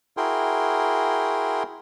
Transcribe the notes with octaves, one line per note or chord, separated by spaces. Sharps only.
E4 F#4 G#4 A#4 G5 C6